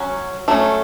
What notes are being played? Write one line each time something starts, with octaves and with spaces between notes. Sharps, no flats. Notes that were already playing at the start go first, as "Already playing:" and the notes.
Already playing: F#3 C#4
F#3 A3 C#4 A4